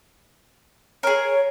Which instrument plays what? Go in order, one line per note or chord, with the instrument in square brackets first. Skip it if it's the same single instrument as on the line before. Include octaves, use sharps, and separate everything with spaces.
[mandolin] G#4 A#4 [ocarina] C#5